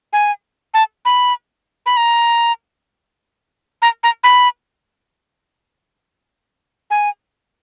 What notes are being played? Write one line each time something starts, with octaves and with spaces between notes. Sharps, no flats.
G#5
A5
B5
B5
A#5
A#5
A#5
B5
G#5